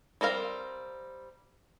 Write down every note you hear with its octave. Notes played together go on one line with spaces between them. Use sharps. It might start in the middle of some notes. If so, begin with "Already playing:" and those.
G3 C4 A#4 F5